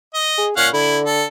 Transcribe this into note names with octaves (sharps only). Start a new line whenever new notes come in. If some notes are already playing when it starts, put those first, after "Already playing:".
D#5
G#4
A#2 C#4 F5 F#5
D3 E4
A4